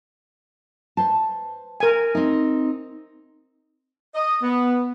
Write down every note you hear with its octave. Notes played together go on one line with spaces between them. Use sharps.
B4 C5 A5
A#4 G#5
C4 D#4
D#5
B3